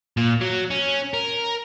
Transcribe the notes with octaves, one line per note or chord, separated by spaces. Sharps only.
A#2
F#3
C#4
A#4